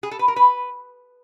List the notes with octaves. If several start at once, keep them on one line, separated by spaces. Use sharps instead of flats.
G#4
A4
B4
A#4
B4